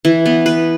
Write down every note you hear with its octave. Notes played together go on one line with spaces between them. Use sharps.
E3
B3
B4